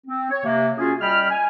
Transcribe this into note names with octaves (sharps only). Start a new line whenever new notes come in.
C4
C#5
C3 A#3
C#4 F4 F#4 G#4
G3 D#5 G5 B5 F6
G#5